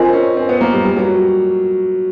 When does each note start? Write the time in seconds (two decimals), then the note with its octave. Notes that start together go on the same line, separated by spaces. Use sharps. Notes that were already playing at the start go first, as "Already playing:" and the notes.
Already playing: C4 F4 A#4 D#5 G#5
0.13 C#4
0.37 C4
0.49 B3
0.61 A#3
0.73 G3
0.85 G3
0.97 F#3